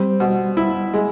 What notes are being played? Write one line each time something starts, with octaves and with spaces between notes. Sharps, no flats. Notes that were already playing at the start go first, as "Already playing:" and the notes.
Already playing: G3 C4
B2
E4
G#3